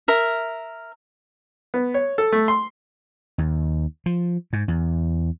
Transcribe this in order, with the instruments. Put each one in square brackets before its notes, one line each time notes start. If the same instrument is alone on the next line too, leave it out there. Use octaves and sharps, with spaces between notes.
[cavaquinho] A#4 E5
[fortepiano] B3
C#5
A4
A3
C6
[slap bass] D#2
F3
G#2
E2